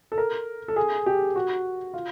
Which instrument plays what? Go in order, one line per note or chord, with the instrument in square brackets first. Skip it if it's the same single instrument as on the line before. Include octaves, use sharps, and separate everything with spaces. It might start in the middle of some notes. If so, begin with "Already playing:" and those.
[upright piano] A4
A#4
A4
G#4
G4
F#4
F4